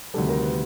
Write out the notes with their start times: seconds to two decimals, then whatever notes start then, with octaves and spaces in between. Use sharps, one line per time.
0.14 D2 C3 D#3 G3 A4
0.29 A#4
0.40 A#4
0.44 B4